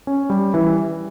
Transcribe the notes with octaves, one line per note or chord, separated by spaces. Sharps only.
C#4
G3
E3